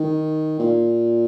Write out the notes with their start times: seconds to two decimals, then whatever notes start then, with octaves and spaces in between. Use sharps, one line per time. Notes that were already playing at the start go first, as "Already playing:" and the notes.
Already playing: D#3
0.59 A#2